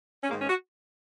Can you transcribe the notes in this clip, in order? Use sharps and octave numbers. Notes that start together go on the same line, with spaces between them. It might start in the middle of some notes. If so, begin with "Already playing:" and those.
C#4
G#2 D#3 G#3 A#3
C#4
F#4